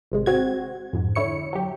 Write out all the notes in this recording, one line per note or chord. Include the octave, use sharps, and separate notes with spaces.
G#1 C3 G#3
C4 F#4 G#6
F2 G#2
D3 E4 C#5 C#7
F#3 G4